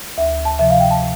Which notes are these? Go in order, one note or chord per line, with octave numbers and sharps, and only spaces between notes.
D2 E5
A5
C3 F3 E5
F5
G5
A5